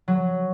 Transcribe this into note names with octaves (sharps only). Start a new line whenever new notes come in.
F#3